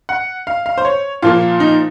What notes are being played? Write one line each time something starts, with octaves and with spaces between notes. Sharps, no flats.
F#5
F5
F5
C5
C#5
A#2 F3 A#3 F4
D#4